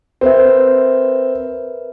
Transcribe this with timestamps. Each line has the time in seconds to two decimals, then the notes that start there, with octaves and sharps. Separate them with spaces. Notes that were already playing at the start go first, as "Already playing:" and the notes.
0.21 C4 A#4 B4 E5